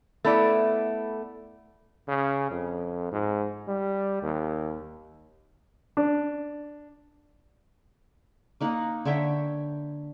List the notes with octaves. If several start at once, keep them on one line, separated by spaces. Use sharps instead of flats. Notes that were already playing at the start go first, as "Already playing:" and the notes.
A3 B3 E4 D5
C#3
F2
G#2
G3
D#2
D4
A#3 D#4 F#5
D3 C#5 E5 G5